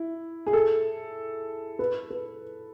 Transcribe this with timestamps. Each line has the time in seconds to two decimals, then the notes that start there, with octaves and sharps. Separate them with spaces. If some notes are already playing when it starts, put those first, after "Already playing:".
Already playing: E4
0.47 G#4
0.53 A4
1.79 B4
2.10 B4